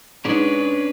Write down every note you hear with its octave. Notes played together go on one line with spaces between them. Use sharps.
G#2 C#4 D4 B4